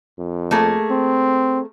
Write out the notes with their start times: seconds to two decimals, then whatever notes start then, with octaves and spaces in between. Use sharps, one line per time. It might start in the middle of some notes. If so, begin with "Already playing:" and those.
0.19 F2
0.51 A3 A#3 G#4
0.90 C4